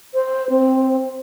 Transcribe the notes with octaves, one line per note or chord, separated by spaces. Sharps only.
C5
C4